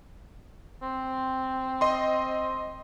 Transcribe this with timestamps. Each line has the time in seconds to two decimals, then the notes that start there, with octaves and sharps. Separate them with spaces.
0.82 C4
1.81 D#5 C6